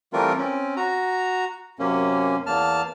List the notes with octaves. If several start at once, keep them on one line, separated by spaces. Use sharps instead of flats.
E3 G3 A3 C4 F4 A#4
C4 C#4
F#4 A#5
F#2 C3 A#3 C#4
E2 A#3 A5 F6